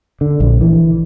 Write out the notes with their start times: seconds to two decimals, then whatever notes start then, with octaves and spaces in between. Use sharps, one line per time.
0.21 D3
0.40 A#1
0.61 E3